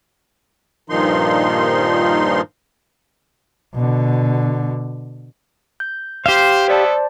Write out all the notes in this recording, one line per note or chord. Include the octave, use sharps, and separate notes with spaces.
G2 A#2 D#3 F3 D#4 C6
B2 D3
G6
G4 C5 F5
B3 E4 A4 C5 D5 A5